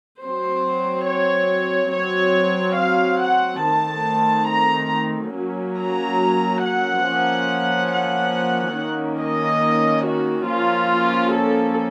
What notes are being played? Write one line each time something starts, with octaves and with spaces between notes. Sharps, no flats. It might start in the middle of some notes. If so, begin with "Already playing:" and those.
F#3 C4 C5
C#5
F#3 C4 C#5
F5
F#5
D#3 A3 C4 A5
A#5
F#3 A#3 C#4
A#5
F#5
F3 A#3 C#4
F#5
D#3 A#3 C#4
D#5
F#4
F3 A#3 C#4 F4
A4